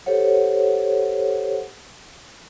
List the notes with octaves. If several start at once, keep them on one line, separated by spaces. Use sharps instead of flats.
G4 A4 C5 C#5 F#5